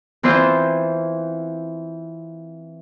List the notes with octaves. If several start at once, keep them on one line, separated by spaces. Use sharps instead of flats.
E3 C4 F4 C5 E5